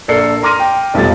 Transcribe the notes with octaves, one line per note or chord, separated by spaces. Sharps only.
A#1 A4 A#4 D5 C7 C#7
A#5 C6 D6 F6 A#6 D#7
G5
F1 B1 F3 G3 A6